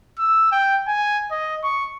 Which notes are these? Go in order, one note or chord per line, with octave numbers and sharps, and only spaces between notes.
E6
G5
G#5
D#5
C#6